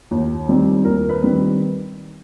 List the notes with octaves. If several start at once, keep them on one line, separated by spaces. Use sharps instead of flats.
D#2
D#3 G3 C4
D#2 A#4
B4
D#3 G3 C4